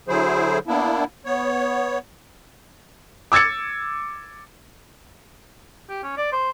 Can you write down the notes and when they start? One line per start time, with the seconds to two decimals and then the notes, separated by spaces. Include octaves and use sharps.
0.08 D3 F#3 E4 G#4 C5
0.67 A#3 B3 D4 E4
1.25 B3 C#5
3.32 D6 E6 G#6 A6 C#7
5.89 G4
6.03 C#4
6.17 D5
6.32 C5